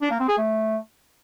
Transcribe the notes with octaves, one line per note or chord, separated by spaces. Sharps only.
D4
A#3
C4
G#4
A3